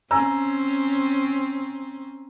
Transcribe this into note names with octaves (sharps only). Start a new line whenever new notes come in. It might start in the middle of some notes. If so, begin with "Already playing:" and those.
C4 C#4 G#5 A#5 E6